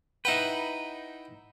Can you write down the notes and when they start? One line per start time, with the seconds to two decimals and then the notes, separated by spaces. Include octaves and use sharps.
0.25 D#4 E4 B4 F#5 G5